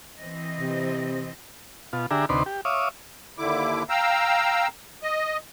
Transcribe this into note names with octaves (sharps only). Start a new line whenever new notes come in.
E3 C4 D#5
C3
B2 F4
D3 D4 G4 G#4 E5 A#5
D2 C3 D#4 B4 D5 C6
G4
C#5 E5 F5 D6 D#6
D#2 D3 E4 D6
F5 G5 A#5 E6
D#5